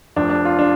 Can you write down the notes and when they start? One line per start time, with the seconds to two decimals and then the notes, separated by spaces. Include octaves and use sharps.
0.16 F1 F2 F3 D4
0.30 D4
0.45 F4
0.59 D4